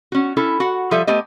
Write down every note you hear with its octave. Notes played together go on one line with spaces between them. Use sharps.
C#4 F#4
C#4 E4 A4
F#4 F#5
F3 G3 F4 A4 E5
A3 B3 G4 D#5